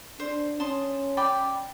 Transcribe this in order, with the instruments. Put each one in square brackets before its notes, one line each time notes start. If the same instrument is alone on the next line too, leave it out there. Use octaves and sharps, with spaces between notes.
[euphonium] D4 [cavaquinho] C5
[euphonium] C#4 [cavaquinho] A5 C6 D#6
[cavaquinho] D5 G5 B5